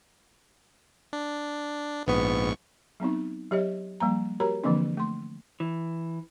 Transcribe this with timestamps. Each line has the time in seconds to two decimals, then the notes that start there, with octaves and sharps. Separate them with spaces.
1.13 D4
2.07 A#1 G#2 B3 C#6
3.00 F#3 B3 C4 D#4
3.51 F#3 G4 C#5 D#5
4.00 F3 G3 A#3 A#5
4.40 F#4 G4 A#4 C#5 A#5 B5
4.64 D3 E3 F3 A#3 C4 D4
4.97 A3 C6
5.60 E3